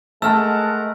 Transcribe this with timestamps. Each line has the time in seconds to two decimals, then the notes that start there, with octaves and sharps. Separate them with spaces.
0.22 G#3 A3 A#4 F#5 A5 E6 F6